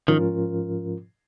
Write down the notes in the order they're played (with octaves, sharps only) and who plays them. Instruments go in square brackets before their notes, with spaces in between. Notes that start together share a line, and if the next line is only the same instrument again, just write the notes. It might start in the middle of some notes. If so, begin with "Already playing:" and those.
[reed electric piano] G#2 F3 C#4 F4 A#4 [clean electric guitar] D#3